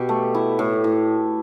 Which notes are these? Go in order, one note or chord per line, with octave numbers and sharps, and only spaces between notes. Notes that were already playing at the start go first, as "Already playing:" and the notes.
Already playing: B2 G4
A3
E4
A2
A2